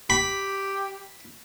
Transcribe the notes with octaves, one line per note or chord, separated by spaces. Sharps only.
G4 B5